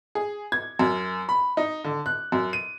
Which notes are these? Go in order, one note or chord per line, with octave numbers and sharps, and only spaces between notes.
G#4
G#6
F#2
B5
D#4
D3
F#6
F#2
D#7